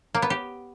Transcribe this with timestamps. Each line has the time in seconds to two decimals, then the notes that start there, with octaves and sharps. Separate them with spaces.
0.15 A#3
0.22 B3
0.30 G4